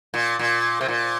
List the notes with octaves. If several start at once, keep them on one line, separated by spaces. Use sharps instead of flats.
A#2
A#2
C3
A#2